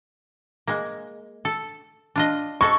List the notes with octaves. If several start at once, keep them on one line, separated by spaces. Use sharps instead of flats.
G#3 A#3
A4
D4 F4 D#5
G#3 A4 C#6